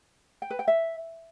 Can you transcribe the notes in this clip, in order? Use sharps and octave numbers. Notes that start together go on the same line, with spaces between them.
G5
B4
G5
E5